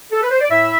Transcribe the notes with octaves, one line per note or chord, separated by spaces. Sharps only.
A4
B4
C5
D5
A2 E4 E5